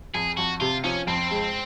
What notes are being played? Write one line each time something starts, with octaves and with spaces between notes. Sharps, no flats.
F2 G#4
F2 F#4
C3 F4
F3 C#4
F2 C4
G#3